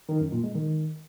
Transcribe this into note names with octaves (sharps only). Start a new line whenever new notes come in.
D#3
F#2
A#2
G#3
D#3